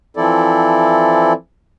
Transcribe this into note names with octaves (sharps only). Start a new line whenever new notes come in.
E3 F3 C4 E4 A4 D5